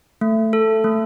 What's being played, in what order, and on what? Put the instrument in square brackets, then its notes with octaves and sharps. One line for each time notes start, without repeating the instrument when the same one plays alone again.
[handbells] A3
A4
A3